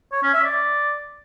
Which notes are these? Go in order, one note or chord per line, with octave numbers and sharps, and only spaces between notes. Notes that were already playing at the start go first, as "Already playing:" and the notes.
C#5
C#4
E5
D5